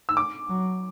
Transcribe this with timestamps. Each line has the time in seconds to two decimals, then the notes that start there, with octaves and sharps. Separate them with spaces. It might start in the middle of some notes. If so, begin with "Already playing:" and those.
0.09 E6
0.17 D6
0.49 F#3